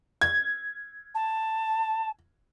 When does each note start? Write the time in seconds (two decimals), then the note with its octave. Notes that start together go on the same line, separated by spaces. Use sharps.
0.21 G#6
1.15 A5